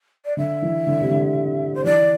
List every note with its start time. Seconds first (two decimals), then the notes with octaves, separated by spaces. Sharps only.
0.25 D5
0.37 D3 E5
0.62 E3
0.87 D3
1.01 C3
1.11 D3
1.74 C5
1.84 E3 D5